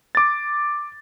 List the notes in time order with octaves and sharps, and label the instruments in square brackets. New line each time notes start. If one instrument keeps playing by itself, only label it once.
[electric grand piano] D6 A6